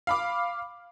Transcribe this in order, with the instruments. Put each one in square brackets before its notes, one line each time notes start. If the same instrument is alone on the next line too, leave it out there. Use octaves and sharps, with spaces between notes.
[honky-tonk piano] F5 B5 D6